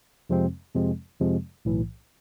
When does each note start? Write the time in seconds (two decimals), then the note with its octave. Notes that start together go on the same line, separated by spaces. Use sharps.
0.30 F2 C3 F3 G#3 C4
0.75 F2 C3 F3 G#3 C4
1.20 F2 C3 F3 G#3 C4
1.65 B1 A2 E3